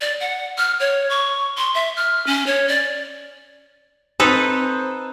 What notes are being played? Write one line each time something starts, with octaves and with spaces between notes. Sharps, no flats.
D5
F#5
F6
C#5
C#6
C6
E5
F6
C#4
C#5
D5
C4 D#4 A4 B4 C5